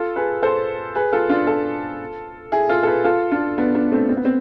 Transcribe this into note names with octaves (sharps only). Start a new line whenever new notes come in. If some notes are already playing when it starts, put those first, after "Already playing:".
Already playing: F4 A4
G#4 B4
A4 C5
G#4 B4
F4 A4
D4 F4
F4 A4
E4 G#4
F4 A4
A4
G#4 B4
F4 A4
D4 F4
B3 D4
B3 D4
A3 C4
C4
B3
C4